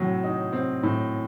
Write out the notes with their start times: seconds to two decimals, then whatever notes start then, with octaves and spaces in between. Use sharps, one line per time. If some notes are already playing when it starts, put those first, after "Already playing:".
Already playing: A2 F#3 C4
0.23 D#4
0.52 C4
0.83 A2